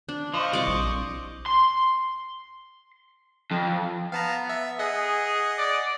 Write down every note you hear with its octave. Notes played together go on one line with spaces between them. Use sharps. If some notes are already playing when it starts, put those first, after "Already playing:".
D4
F3 C5 D#5 C#6
C2 D5 D6
A#1
C6
F2
B3 F5 A5 A#5
E5
G#4 D#5 F#5
D5